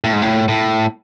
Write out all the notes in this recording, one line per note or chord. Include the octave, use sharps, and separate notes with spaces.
A2
G#2
A2
A2